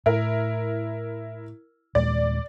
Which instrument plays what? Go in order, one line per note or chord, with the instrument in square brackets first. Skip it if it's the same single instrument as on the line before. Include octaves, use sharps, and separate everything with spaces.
[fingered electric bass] A2 [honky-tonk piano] E4 A#4
[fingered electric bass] D#2 A#2 G#3 [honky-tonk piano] D5